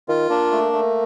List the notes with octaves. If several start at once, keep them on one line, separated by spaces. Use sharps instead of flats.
D#3 F4
A#3 D4
A3
A3